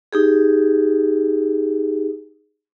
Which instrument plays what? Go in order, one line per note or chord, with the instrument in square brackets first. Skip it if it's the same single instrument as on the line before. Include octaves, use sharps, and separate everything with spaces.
[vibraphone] D#4 G4 G#4